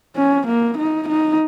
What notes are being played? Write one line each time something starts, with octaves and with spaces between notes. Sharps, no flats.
C#4
A#3
D#4
D#4